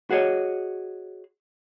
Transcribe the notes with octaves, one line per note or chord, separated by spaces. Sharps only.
F#4 G#4 C#5 D#5